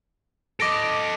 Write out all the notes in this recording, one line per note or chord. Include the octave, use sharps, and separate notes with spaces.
A4 D#5 D6 A#6 D7